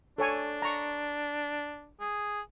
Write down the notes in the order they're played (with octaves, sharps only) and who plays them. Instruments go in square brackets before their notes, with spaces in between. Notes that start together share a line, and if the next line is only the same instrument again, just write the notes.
[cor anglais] D4 [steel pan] A4 C#5 G#5
[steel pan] A#5 C#6
[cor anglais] G#4